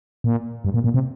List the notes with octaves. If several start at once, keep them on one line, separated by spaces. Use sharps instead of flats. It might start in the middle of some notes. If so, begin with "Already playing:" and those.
A#2
G2
A#2
A#2
C3